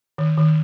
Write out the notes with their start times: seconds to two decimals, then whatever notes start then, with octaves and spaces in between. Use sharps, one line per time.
0.18 D#3
0.37 D#3